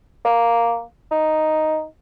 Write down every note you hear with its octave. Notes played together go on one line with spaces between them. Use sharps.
A#3
D#4